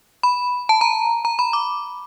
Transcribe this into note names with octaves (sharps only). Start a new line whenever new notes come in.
B5
A5
A#5
A#5
B5
D6